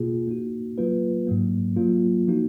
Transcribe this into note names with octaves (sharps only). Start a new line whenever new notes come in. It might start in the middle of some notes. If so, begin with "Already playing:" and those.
Already playing: B2 A#3 F4 G#4
A#3 D#4 F#4
F#3 A#3 F4 B4
G#2 F#3 A#3
F#3 A#3 F4
F3 A#3 D#4 F#4